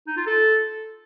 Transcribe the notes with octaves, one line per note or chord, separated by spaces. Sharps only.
D#4
F4
A4